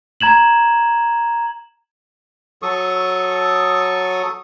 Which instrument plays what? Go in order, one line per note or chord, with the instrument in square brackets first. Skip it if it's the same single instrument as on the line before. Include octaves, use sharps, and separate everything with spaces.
[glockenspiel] A#5 G#6 E7 F#7
[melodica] F#3 A4 C#6 D#6